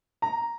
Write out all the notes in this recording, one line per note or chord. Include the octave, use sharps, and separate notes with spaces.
A#5